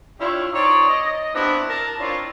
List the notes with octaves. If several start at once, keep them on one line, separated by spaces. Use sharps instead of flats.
D4 E4 F4 G4 C#5
C4 D#4 C#5 D5
D#5
B3 C4 D4 E4 F#4 G4
A#4 A5
C4 D4 E4 F4 A#4 C#5